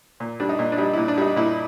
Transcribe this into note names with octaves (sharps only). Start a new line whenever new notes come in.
A#2
G3 D4
D#4
A#2
D4
G3 D#4
A#2 E4
D4
G3 D#4
A#2 E4